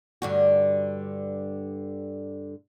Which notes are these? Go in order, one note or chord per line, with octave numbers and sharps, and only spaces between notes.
G2 D3 F#4